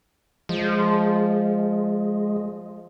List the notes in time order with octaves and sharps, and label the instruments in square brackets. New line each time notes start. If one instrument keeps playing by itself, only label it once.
[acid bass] F3 [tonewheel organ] G#3